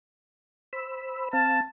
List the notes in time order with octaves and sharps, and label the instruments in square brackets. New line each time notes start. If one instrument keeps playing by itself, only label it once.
[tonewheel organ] C5 B5 E6
[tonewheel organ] C4 F5 [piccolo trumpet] A5